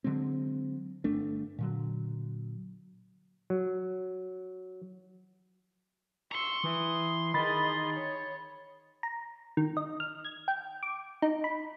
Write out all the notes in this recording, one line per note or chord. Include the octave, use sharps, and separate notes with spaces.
D3 F#3 G#3 C4
G1 A3 D4
A#2 D3 F#3
F#3
A#5 C6 C#6 E6
E3 D#6
D#3 G#4 D#5 B5 A6
C#5
A#5
D#3
D#5
F6
G#6
G5
D6
D#4
B5